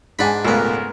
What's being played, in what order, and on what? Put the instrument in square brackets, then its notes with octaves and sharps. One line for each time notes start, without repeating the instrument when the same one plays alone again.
[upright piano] G#2 F#5 G#5 [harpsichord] D4 B5
[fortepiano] C#2 A3 [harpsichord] A#2 B3 [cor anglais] A#4